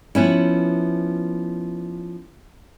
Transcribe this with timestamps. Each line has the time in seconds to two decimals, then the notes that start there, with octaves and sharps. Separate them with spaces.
0.15 F3 B3 C#4 E4